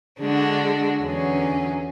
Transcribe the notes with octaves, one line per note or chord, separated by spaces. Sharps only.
D3 G#3 D4 F#4
E2 D3 F#3 C#4 G#4